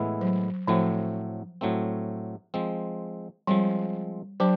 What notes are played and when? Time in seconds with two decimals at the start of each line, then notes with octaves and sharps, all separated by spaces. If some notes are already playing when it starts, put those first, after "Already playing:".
Already playing: A2 E3 G#3 B3 E4
0.21 F#3
0.67 A2 F3 F#3 A3 C4
1.61 A2 F#3 A3 C4
2.54 F3 G#3 C4
3.47 F3 G3 G#3 C4
4.40 F#3 D4 G4